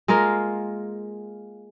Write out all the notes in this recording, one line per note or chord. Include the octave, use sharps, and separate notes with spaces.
G#3 A#3 F4 A#4